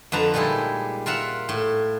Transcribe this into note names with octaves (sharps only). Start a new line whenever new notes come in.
F2 D3 B4 A5 A#5
A#2 G3 G#3 D#4 E4
F4 A#4 E5 F#5
A2